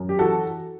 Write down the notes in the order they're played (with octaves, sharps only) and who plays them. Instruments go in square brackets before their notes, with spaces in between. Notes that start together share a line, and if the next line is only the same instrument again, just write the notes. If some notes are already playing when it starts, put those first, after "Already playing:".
Already playing: [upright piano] F#2
G4
E3 F#4 A4